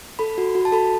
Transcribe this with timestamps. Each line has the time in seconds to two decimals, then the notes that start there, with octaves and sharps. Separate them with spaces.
0.19 A4 B5
0.38 F#4
0.55 F#4
0.65 A5
0.72 A4 B5